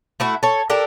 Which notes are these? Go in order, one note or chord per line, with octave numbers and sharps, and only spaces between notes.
A3 E4 F#4
A4 C#5
D4 G4 A4 A#4